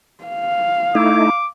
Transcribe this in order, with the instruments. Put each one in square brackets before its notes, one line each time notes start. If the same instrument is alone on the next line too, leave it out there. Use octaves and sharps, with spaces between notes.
[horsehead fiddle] F5
[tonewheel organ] A3 D#4 E4 [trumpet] D6